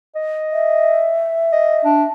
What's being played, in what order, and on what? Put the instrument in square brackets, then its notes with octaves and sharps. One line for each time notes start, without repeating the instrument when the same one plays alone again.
[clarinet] D#5
[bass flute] E5
[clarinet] D#5
D4